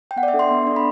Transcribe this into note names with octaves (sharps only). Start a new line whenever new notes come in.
G5
B3 F#5
D5
E5
D4 A4
C6
B3
D4 A4
B5